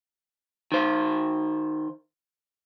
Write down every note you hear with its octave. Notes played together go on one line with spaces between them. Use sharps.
D#3 C5